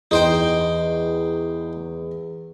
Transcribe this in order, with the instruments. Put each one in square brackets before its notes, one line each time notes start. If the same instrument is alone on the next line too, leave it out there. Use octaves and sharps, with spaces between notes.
[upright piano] E2 [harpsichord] D#4 C5 G5